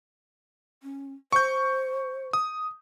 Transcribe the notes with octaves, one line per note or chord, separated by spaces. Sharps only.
C#4
C5 C#6 G6
D#6